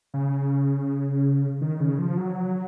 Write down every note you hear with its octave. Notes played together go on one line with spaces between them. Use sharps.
C#3
D#3
C#3
F3
F#3